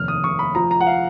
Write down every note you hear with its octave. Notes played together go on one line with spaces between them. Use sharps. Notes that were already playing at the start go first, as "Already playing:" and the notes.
Already playing: F1 D#2 F6
D#6
F1 C#6
B5
F3 A#5
A#5
F#5
F5